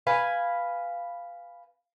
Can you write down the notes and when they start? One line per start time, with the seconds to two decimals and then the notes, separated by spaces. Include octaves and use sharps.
0.07 B4 F5 G#5